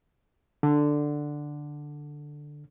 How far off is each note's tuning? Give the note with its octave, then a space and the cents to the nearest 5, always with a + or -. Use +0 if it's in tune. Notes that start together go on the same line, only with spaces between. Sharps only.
D3 +5